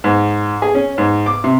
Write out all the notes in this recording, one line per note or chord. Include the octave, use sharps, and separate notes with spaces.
G#2
G#4
C#4
G#2
D6
C3